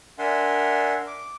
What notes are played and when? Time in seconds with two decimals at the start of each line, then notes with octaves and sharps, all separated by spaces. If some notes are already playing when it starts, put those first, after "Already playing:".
0.19 D4 A#4 E5 F#5 G#5 C6
1.07 D6